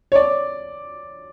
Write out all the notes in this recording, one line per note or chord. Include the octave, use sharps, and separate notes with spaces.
C#5
D5